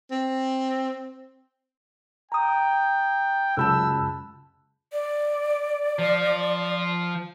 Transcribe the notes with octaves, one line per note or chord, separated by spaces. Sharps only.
C4
G5 A#5 D#6
C#2 F#2 A5 B5 E6 F#6 G6 E7
D5
F3